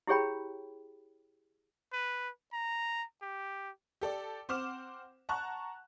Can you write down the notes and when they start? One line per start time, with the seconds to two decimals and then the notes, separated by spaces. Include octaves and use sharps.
0.07 E4 G4 G#4 C#5 G5 B5
1.93 B4
2.53 A#5
3.22 G4
4.01 G4 A4 D5
4.49 C4 C5 F#5 D6 F6 E7
5.29 F#5 A5 A#5 C#6 F#6